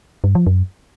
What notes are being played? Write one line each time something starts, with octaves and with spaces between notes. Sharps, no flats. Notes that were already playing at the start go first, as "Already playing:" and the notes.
G2
F3
F#2